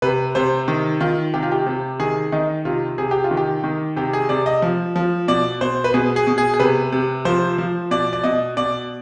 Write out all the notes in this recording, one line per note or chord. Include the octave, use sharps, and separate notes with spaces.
C3 B4
C3 C5
D#3
D#3 F4
C3 G4
F4
G4
C3
D#3 G#4
D#3 D#4
C3 F4
C3 G#4
G4
F4
D#3
G4
D#3
C3 G4
G#4
C3 D5
D#5
F3
F3
B2 D5
B2 C5
B4
B2 G#4
G#4
B2
G#4
G#4
C3 B4
C3
F3 C5
F3
B2 D5
D5
B2 D#5
B2 D5